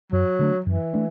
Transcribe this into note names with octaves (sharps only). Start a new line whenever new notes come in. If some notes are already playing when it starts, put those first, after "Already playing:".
F#2 F#3
D3 A3 D4
F#2 E3
A3 D4